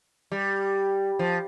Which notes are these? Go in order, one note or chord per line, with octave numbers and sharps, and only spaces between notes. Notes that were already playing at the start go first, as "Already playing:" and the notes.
G3
F3